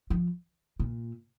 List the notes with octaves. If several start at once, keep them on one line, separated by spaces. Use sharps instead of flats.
F3
A#2